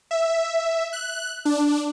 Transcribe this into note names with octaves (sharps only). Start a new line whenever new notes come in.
E5
F#6
D4